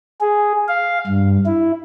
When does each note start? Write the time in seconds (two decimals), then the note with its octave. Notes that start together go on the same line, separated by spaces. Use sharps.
0.21 G#4
0.68 F5
1.07 G2
1.46 E4